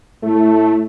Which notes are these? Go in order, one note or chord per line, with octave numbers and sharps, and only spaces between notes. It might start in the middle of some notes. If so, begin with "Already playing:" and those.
A2 A3